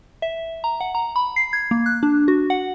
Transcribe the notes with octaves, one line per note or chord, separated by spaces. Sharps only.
E5
A#5
F#5
A#5
B5
C7
G#6
A#3
F#6
D4
F#4
F#5